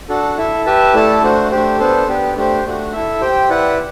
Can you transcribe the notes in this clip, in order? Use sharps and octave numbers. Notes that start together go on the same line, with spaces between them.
D4 F#4 A4
E4 A4 E5
G4 B4 E5 A5
A3 E4 A4 D5 A5
A3 D4 F#4 C5
A3 D4 G4 C5
B3 D4 A4 C5
B3 D4 G4
A3 D4 G4 C5
A3 D4 F#4
E4 A4 E5
G4 C5 G5
E4 B4 D5 F#5